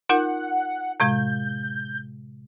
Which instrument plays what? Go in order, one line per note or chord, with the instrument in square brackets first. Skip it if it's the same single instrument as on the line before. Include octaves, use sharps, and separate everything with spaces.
[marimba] D#4 F4 A#4 [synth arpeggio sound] F#5
[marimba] A2 C3 G#3 [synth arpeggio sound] G6